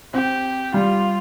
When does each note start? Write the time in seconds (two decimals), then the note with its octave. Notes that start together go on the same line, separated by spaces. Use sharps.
0.13 C4 G4
0.74 G3 F4